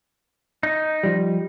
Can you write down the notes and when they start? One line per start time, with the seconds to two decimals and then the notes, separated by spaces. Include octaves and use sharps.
0.63 D#4
1.03 F3 G3